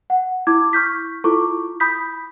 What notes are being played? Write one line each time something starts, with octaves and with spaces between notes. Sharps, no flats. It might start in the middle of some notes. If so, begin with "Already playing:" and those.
F#5
E4 D6 G#6
C#6 F6 G6 B6
E4 F4 A4 C#6 D6
B5 D#6 G6 B6